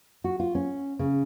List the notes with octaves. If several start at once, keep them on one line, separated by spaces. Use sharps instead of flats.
F#4
F4
C#4
C#3